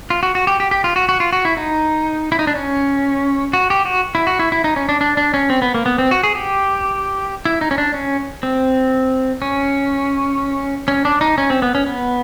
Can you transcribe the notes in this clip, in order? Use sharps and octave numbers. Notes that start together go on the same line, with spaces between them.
F4
F#4
F#4
G4
G4
G4
F4
F#4
F#4
F4
F#4
E4
D#4
E4
D#4
D4
C#4
F#4
G4
F#4
E4
F#4
E4
E4
D#4
C#4
D4
D4
D4
C#4
C4
B3
A#3
B3
C4
F#4
G#4
G4
E4
D#4
C#4
D4
C#4
C4
C#4
C#4
D4
D#4
C#4
C4
B3
C#4
B3